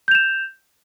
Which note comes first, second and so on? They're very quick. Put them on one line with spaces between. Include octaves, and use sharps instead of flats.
G6 F7 E7